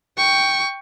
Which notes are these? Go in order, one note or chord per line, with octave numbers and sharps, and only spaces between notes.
G5 C#6